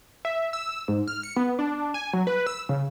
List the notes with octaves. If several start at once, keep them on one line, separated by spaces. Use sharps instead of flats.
E5
E6
G#2
F6
C#7
B3
D4
G#5
F#3
B4
E6
C#3